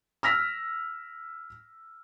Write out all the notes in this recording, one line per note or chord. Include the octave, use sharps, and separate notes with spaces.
E6 F6 A#6 B6